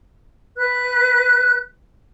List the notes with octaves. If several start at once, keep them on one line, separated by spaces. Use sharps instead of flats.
B4 F#6